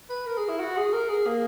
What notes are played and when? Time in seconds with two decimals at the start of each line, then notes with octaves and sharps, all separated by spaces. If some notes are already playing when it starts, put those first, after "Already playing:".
0.10 B4
0.26 A#4
0.38 G#4
0.49 E4
0.60 F#4
0.77 G#4
0.94 A#4
1.10 G#4
1.27 A#3